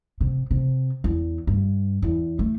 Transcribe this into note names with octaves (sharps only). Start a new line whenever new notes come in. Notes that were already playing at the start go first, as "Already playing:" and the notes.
C3
C3
E2
G2
E2
A3